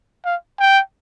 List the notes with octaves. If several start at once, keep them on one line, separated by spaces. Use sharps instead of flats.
F5
G5